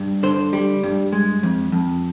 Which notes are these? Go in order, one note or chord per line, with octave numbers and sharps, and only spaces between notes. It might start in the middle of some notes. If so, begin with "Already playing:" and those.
Already playing: G2
D3 C5
G3
G2
G#3
F2
F2